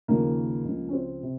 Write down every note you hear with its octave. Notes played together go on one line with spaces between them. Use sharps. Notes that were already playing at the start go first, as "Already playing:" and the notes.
D#2 C#3 F3 A#3
C#2 C#3 F3
C#4
C4
C3